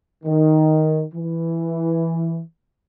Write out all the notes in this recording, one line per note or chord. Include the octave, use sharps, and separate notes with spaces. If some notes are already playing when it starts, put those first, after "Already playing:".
D#3
E3